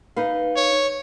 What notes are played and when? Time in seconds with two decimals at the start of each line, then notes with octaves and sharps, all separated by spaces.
0.16 D#4 B4 F5
0.56 C#5